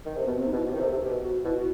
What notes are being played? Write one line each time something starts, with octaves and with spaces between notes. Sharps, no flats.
D#3
C3
B2 B3
C4
C3
D#4
B2
E4
B2 G4
D#3
C3
A4
C3
B2 G4
F#4
B2 E4
F#4